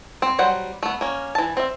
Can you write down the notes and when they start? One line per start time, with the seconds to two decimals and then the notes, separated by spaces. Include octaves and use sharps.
0.22 C4
0.39 F#3 G3 C5 F#5
0.83 A3 B3
1.01 A#3 C#4
1.35 E3 A5
1.57 C4 E5